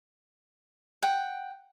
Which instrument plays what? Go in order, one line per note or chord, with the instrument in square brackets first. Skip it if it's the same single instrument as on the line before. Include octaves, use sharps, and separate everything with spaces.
[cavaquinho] F#5 G5